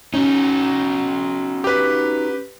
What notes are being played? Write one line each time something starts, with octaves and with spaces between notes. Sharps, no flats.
C#4 D#4 F#4
G4 B4